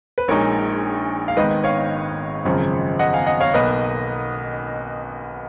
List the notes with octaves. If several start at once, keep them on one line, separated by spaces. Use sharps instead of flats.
B4
A#1 A#2 G#3 D#4 A#4 C#5
F5
G#1 G#2 D#3 B4 D#5
C#5 F5
G#1 F#2 C#3 F3
D#5 F#5
F5 G#5
D#5 F#5
C#5 F5
B1 B2 A#3 B4 D#5